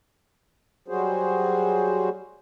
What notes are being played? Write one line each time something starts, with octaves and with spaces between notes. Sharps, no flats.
F#3 G3 F#4 G#4 C5